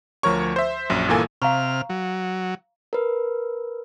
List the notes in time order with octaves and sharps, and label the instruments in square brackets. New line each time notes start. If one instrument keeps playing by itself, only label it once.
[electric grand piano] D2 F3 A#4 C#5 C#6
C5 E5
A#1 F#2
G1 A#2 E3 A#3 A4 G#5
[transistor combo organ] C3 F6 [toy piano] F5 A#5 C#6
[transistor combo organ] F#3
[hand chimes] A#4 B4